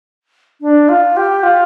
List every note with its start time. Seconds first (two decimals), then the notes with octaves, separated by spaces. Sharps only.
0.61 D4
0.89 F4
1.17 G4
1.43 F4